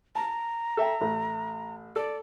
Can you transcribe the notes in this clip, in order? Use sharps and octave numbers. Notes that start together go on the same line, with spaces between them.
A5 A#5
A4 E5 G5
A1 A3
A4 D5